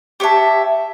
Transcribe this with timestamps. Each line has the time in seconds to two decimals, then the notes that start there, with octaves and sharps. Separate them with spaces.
0.20 G4 C#5 E5 A5